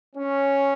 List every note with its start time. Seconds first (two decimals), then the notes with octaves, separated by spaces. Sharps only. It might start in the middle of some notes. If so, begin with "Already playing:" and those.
0.15 C#4